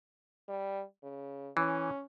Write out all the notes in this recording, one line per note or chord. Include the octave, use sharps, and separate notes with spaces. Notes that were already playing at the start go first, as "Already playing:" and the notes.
G3
C#3
E3 C#4